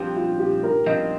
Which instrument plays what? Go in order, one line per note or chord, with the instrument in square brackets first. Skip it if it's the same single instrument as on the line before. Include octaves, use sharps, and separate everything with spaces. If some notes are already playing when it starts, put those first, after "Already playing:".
Already playing: [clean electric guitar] G2 F3 C4 [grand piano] G4
[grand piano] F4
G4
A#4
[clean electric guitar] G2 F3 C4 [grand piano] D#5